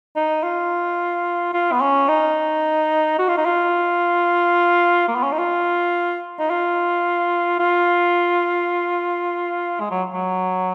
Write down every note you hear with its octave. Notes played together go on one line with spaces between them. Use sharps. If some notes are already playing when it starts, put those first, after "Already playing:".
D#4
F4
F4
B3
C#4
D#4
F#4
F4
D#4
F4
A#3
B3
C#4
D#4
F4
D#4
F4
F4
G#3
F#3
F#3